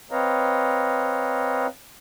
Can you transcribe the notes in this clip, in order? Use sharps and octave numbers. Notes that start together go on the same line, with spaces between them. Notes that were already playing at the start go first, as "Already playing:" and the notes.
C4 B4 C#5 D#5 F5 A#5